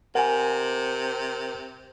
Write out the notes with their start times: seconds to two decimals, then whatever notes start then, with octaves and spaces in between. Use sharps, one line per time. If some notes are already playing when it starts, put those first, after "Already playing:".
0.15 C3 A#4 F#5 G#5